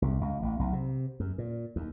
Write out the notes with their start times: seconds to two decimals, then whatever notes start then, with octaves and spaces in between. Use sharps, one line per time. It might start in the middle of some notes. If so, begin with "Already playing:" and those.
0.02 C2
0.21 C#2
0.42 A1
0.59 B1
0.73 C3
1.20 F#2
1.38 A#2
1.76 D#2